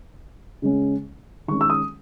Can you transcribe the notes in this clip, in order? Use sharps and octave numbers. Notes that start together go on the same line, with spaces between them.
C#3 G#3 C#4
D#3 G#3 C#4 C#6
E6
D#6